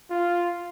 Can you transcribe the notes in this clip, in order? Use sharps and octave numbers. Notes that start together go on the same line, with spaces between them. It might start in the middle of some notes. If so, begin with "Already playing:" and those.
F4